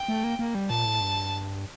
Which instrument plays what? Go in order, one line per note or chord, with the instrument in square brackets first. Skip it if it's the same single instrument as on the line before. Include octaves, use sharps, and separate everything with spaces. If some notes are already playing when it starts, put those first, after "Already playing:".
Already playing: [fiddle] G5
[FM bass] A3
A#3
A#3
G3
[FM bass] A#2 [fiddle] A5
[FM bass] A2
G2